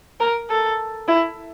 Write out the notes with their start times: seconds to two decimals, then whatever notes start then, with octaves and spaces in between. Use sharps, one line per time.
0.20 A#4
0.50 A4
1.08 E4